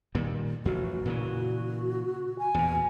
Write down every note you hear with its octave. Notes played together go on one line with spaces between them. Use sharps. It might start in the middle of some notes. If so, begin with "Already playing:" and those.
A#2 D#3 G3
A1 F2 F#4
A#2 C#3 E3
G#5
E2 A#2